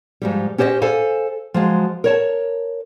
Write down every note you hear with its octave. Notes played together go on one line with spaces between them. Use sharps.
G#2 F3 G3
C#4 G4 C5 D5 D#5
A4 C5 F5 G#5
F3 F#3 G#3
A#4 C#5 A5